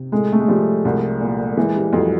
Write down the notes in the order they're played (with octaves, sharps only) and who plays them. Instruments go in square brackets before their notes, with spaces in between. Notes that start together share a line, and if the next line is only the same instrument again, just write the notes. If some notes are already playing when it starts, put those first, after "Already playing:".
Already playing: [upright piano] C3
[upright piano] A2 [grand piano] G#3
[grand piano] A3
G#3
[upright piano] F3 [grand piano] G3
[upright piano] C2
A#2
[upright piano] E3 [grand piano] G#3
[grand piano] G3
[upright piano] F2 [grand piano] F#3